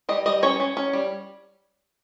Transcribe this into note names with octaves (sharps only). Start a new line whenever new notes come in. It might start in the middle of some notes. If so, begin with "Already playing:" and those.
G3 D#5
G3 D#5
C#4 C#5
C#4
C#4
G3